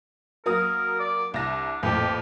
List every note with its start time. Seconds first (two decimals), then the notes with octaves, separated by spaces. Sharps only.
0.46 F#3 A#3 A#4 D#6
1.00 D5
1.34 C2 D4 A#6
1.83 A1 F2 A#2 G4